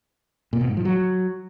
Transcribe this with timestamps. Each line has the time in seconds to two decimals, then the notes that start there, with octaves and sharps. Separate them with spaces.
0.53 A#2
0.61 B2
0.69 G#2
0.77 F3
0.85 F#3